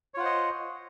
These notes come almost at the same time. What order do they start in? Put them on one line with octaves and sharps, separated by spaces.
C#5 F4 F#5 C5 D#5